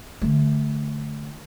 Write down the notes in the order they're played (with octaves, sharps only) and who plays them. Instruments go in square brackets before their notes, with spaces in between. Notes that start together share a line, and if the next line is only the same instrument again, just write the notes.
[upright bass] D3 A3